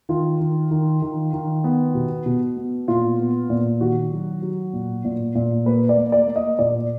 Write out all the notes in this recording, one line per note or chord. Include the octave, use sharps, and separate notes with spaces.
D#3 F4
D#3
D#3
D#3
D#3
B3
B2
B2
B3
A#2 F4
B3
A#2
D#3 F#4
F#3
F#3
A#2
A#2
A#2
A#3 B4
D5
A#3
D5
A#3
D#5
A#2 D5